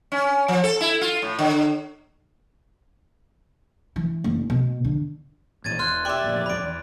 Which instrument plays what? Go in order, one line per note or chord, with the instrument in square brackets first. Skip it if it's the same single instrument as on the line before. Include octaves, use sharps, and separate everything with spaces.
[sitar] C#4
F3
A4
E4
F4
A2
D3
[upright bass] E3
F#1
B2
D3
[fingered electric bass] G#1 A#2 E3 [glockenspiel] G#6 A6 D#7
[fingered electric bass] E1 [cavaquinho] C6 [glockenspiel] F6 F#6 G#6
[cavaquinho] G4 E5 [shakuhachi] D5 [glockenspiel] C6 D6
[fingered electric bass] G1 A#2 F3
[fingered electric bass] D#1 A1 F2 [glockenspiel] B5 D7
[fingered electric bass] E2